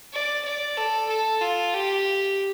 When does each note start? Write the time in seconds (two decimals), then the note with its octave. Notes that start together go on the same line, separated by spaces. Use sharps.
0.13 D5
0.45 D5
0.78 A4
1.10 A4
1.42 F4
1.74 G4